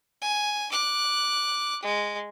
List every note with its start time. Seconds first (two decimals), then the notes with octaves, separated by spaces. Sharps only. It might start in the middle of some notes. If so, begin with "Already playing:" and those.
0.22 G#5
0.72 D6 F#6
1.83 G#3